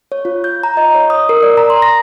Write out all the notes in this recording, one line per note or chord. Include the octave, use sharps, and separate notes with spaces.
C#5
F4
G6
A#5
D#5
C#5
D#6
A#4
D5
A#5
C6
A#6